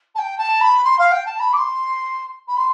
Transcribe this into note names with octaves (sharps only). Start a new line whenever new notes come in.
A5
G5
A5
B5
C6
F5
G5
A5
B5
D6
C6
B5
C6